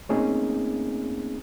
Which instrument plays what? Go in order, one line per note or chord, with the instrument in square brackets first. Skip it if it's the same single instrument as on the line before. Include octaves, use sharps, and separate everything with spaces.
[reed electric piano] A3 A#3 C4 C#4 D#4 G#4